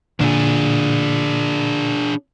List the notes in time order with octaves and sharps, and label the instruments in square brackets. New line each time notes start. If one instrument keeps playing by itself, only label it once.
[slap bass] A#2 D3 [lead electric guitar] D4 G#4